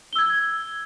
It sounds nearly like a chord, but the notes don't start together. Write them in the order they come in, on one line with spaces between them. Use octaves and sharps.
G7 E6 G#6